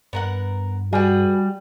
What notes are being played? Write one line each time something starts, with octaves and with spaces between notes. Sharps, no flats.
G2 B3 A#4 F#5
G3 F#4 G#4 B4